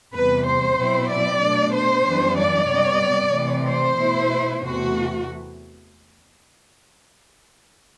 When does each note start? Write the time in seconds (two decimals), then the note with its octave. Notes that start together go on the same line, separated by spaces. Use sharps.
0.14 E2 C3 G3 B4
0.47 C5
0.79 B2 F#3 C4 E4
1.11 D5
1.42 B2 A3 D4
1.75 C5
2.06 F#2 E3 G3 B3 D4
2.39 D5
2.71 C3 G3 B3
3.35 C3 E3 A3 C4
3.68 C5
3.99 B2 A3 E4
4.63 E2 C3 E3 A3 F#4